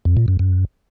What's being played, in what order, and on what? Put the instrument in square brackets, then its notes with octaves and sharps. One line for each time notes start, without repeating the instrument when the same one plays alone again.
[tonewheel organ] F2
A#2
F#2
F#2